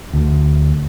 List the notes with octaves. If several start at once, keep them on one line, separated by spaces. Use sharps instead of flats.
D2